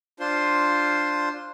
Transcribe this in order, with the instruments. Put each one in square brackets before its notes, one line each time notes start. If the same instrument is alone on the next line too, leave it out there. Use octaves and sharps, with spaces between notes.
[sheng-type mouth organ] D4 F4 C5 C6